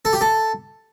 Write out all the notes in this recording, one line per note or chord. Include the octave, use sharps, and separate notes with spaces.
A4
G4
A4